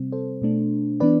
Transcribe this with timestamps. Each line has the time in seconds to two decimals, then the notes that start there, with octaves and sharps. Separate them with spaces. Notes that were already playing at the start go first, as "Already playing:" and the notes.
Already playing: C3 G3 C4
0.12 A4 C5
0.42 B2 A3 D4
1.00 E3 B3 D4 B4 D5